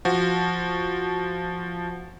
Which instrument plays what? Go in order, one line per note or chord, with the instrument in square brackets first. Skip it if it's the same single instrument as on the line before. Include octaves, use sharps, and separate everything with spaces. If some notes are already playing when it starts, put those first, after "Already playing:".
[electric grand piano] F3 F#4